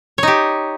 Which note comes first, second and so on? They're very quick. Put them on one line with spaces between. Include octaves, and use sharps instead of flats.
C#5 D#4 G4